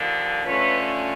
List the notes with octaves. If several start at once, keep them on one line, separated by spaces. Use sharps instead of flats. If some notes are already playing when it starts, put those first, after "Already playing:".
Already playing: D#2 D3 F3
D3 F3 A3 C#4 B4 C#5